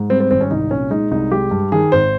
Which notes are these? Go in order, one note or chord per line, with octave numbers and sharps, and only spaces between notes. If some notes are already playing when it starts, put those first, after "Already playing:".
Already playing: G#2
G3 C4
C4
G#1 C4
C#4
C2 D#4
A#2 C#4
G#3 D#4
C2 D#4
G#3 G4
G2
D#3 G#4
G#1 C5